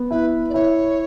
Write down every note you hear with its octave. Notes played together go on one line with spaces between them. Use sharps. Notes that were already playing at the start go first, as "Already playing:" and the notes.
Already playing: B3
E4 B4
D5
E4 C#5